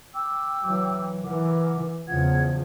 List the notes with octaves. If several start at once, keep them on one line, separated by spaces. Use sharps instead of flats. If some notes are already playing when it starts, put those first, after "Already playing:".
G5 D6 E6
E3 F#3
E3 A#4 F#5 D6
E2 C#3 F3 F#5 G#6